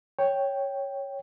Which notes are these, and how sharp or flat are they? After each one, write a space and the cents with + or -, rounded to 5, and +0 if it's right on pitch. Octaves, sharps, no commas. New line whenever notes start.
C#5 +0 G5 +0